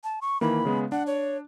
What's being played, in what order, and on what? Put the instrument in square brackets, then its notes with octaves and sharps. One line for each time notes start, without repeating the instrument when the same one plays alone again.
[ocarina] A5
C#6
[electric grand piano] D#3 E3 A#3 [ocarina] B5
[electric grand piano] C#3 G#3 B3
[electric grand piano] D4 [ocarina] F#5
[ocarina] C#5